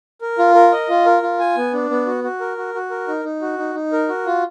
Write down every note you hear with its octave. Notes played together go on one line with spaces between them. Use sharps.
A#4
F4
A#4
D#5
F4
A#4
F4
G#5
B3
D4
B3
F#4
F#4
A#4
F#4
F#4
A#4
D#4
D#4
F#4
D#4
D#4
A#4
F#4
F4